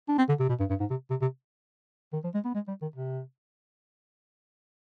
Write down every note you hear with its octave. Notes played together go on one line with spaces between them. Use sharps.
D4
C4
D3
C3
B2
G2
G2
G#2
C3
C3
C3
D#3
F3
G#3
B3
G#3
G3
D#3
C3